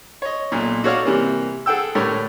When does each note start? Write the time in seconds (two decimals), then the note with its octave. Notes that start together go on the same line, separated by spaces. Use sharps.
0.22 C#5 D#5
0.52 B1 A#2
0.83 D#4 F#4 A4 C#5 D5 F5
1.05 C3 E3 G3 A#3
1.66 G#4 A4 F#5 G5 E6
1.95 A2 D3 A3 G4 A#4 C#5